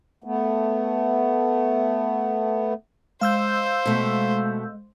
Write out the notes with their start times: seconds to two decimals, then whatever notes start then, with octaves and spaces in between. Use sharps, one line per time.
0.24 A3 B3
3.21 G#3 C5 F5 E6 G6
3.86 B2 A3